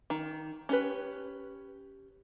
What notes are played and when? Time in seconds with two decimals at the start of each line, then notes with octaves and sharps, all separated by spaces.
0.10 D#3
0.69 C#4 G4 B4